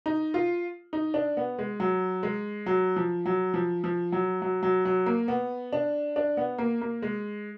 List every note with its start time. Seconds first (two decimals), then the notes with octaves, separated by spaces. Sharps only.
0.06 D#4
0.34 F4
0.93 D#4
1.14 D4
1.37 B3
1.59 G#3
1.80 F#3
2.23 G#3
2.66 F#3
2.96 F3
3.26 F#3
3.54 F3
3.84 F3
4.12 F#3
4.42 F#3
4.63 F#3
4.85 F#3
5.06 A#3
5.28 B3
5.73 D4
6.16 D4
6.37 B3
6.58 A#3
6.81 A#3
7.02 G#3